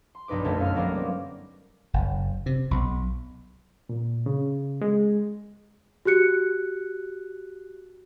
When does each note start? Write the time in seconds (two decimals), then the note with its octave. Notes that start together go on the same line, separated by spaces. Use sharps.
0.15 C6
0.28 B1 G2 D#4 B4 D6
0.44 G1 F#2 A3 C#4 A4
0.61 F5 F6
0.75 F#3 G3 A#3 B3
0.95 G3 C4
1.94 F#1
2.46 C3
2.71 B1
3.89 A#2
4.26 C#3
4.81 G#3
6.05 F#4 G4 F#6 C#7